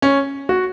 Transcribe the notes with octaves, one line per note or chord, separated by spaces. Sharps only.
C#4
F#4